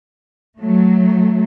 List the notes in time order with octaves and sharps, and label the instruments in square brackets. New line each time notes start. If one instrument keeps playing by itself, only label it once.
[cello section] F#3 A3